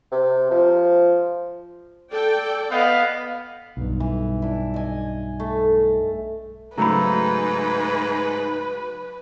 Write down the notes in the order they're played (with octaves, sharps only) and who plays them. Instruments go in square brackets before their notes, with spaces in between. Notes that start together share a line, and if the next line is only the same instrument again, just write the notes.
[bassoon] C3
F3
[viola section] A4 D5 G5
[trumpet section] B3 D#5 F5
[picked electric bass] B1 G2
[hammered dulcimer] E3
D4 E4
D#5 G#5
A3
[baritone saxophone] G#2 [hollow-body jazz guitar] C#3 F#3 A3 [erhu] B4 [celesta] A#5 B5